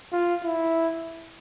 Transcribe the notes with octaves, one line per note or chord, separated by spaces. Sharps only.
F4
E4